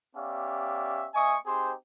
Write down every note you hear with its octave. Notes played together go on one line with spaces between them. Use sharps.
B3 C#4 G4 D5 E5 F5
A#3 D#5 E5 G#5 C#6 D#6
C4 D#4 G4 G#4 C5